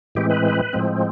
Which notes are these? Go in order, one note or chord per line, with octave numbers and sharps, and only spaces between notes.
A2 E3 G#3 C4 G4
B4
A2 F3 G#3 C4